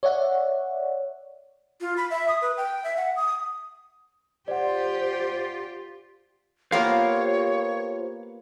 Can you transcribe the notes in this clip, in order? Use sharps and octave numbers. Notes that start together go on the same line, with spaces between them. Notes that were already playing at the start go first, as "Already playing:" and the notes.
C#5 D5 E5 F#5
F4
B5
E5
D#6
B4
G5
E5
F#5
D#6
F4 G4 C5 D5 F#5
A#3 B3 F4 G4 A#4 C5 C#5 F5